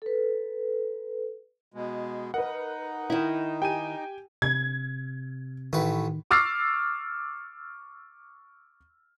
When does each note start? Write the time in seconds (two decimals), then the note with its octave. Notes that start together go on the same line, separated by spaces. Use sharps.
0.02 A4 B4
1.74 B2 G#3
2.34 D#4 A#4 B4 F#5
3.10 D#3 E4
3.62 G4 G5 G#5 D#7
4.42 C3 G#6
5.73 A1 A2 D#3 B4
6.31 C#6 D6 E6 F6 A6 C7